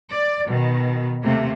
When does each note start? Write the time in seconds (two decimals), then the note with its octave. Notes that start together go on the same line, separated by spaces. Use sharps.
0.12 D5
0.47 B2 D#3
1.23 D#2 C3 A3 A#3